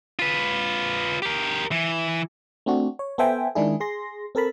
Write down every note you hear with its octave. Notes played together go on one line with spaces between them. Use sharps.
F4 B4
G4 A#4
E3
A3 C4 D4 F#4
C#5
B3 A4 C5 E5 G5 G#5
D#3 G#3 D4 E4 G#4
G#4 C6 A#6
C4 A4 A#4 A5 B5